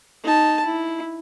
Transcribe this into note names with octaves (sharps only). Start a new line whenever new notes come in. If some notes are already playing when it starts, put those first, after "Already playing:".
D#4 A5
E4